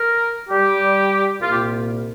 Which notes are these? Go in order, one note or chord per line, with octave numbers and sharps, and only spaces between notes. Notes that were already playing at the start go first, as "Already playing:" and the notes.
Already playing: A#4
G3 G4
C2 A#2 A#3 F4
G4